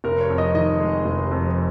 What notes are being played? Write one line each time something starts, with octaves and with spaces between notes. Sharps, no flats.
F1 A#4
C#5
F2
D#5
D#3 D#5
G#3
F1
F2